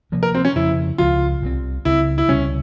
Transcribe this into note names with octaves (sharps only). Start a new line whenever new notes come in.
C3 F3 A#3
A#4
C4
C#4
F2 C#3 F3 E4
C#2 C#3 F3 F4
C2 C3 F3 C4
C#2 C#3 G3 C4 E4
E4
C#2 C3 G3 C#4